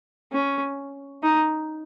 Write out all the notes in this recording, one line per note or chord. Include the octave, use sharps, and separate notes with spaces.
C#4
D#4